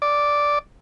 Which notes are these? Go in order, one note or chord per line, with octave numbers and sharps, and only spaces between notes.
D5